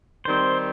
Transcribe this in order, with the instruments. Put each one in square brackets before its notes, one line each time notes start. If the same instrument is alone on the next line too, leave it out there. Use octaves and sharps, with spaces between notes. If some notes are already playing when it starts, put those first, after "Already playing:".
[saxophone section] D#3 G3 C4 [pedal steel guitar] C5